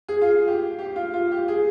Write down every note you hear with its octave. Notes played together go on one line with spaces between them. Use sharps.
G#4
F4
G4
G4
F4
F4
G4
G#4